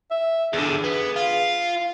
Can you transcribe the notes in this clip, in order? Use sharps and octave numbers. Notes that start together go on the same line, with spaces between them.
E5
E2 D3 G#4
B3
F4